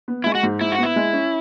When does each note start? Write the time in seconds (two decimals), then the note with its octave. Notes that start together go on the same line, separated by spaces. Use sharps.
0.08 B3
0.24 G#3 E4
0.35 F#4
0.43 G#2
0.61 G#2 E4
0.72 F#4
0.78 B3 E4
0.96 G#3
1.13 C#4